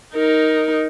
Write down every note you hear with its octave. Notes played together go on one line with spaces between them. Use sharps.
D#4 A#4